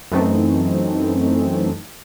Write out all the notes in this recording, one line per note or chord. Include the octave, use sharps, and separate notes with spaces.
F#2 E3 A3 C4 D#4